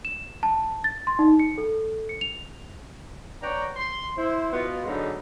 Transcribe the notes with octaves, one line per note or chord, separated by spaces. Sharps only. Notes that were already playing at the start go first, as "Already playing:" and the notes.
E7
A5
A6
C6
D#4
C#7
A4
C#7
F7
B4 C#5 D5 F#5 G5 A#5
C6
E4 C5
B2 B3 F4
G#2 D3 F#3 G#3 B3 D#4